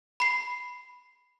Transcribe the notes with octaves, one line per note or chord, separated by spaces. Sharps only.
B5 C7